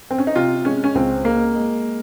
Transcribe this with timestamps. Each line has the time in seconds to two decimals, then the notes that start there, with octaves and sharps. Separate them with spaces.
0.11 C4
0.18 C#4
0.27 D#4
0.36 C3 F4
0.65 G#3 C#4
0.84 C#4
0.95 C#2 C4
1.25 G#3 A#3
1.55 G#3